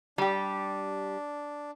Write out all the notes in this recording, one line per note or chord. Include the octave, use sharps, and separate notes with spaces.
G3 D4 G4